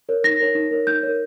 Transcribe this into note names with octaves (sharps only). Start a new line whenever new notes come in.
A#4 C#5
D#4 A#6
A#4 C#5
D#4
A#4 C#5
D#4 G6
A#4 C#5